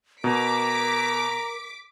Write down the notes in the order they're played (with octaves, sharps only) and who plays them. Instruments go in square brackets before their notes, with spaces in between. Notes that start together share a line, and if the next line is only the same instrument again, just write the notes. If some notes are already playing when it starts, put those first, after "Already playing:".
[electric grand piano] B2 [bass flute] A#4 [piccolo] A#5 [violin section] D6 B6 D7